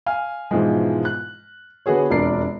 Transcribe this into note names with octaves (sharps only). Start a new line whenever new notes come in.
F5 G#5 F6
G#2 B2 E3 F3 G#3
F#6
D3 B3 F#4 G#4 C#5
E1 F2 D4 A#4 D5 C7